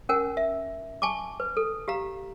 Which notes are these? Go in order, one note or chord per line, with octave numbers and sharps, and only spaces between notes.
C#4 A#4 F#5 G#5
E5
G#5 A5 C#6 D6
B4
A4
G4 F5 A#5